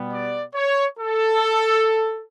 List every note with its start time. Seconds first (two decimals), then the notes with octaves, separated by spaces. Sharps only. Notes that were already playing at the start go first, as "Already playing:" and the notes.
Already playing: B2 G3 B3
0.11 D5
0.54 C#5
0.99 A4